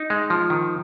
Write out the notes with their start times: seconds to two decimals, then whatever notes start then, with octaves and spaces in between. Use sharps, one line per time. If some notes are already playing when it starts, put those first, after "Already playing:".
Already playing: D#4
0.10 G#3
0.30 F3
0.50 D#3